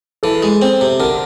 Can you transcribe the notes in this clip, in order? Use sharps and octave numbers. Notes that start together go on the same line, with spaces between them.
E3 A4
G#3
C4
C3
D3 A#4